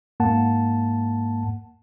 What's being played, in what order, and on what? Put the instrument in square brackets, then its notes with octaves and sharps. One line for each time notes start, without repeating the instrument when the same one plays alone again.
[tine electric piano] G#2 A#3 F#5 A5